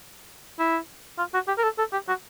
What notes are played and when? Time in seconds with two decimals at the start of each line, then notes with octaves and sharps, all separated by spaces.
0.59 E4
1.18 F4
1.34 F#4
1.48 G4
1.58 A#4
1.64 A4
1.79 A4
1.93 G4
2.08 F#4